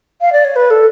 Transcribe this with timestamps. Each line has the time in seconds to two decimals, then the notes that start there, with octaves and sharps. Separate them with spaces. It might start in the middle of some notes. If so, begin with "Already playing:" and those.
0.21 F5
0.33 D5
0.45 C#5
0.56 B4
0.70 A4